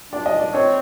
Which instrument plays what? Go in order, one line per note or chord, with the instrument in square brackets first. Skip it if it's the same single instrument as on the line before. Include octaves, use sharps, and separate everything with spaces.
[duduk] D4 [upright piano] D5
[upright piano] D#5
D5
[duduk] C4 [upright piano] C#5